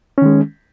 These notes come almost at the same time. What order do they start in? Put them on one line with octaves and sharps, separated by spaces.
C#4 D#3 G#3